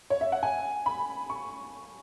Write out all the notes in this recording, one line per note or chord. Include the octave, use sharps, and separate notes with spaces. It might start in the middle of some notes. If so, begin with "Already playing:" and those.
C#5
E5
F#5
G#5
B5
C#6